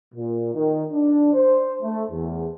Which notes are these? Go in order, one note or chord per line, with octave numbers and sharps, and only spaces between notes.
A#2
D#3
D4
C5
A3
E2